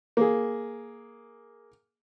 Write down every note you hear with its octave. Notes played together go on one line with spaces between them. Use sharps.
A#3 G#4